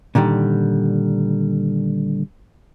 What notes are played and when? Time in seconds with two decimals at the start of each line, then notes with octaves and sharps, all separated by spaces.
0.15 A#2 D3 D#3 G3